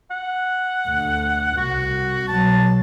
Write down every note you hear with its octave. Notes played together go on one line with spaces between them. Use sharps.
F#5
D2
C2 F#4
B2 F#3 A5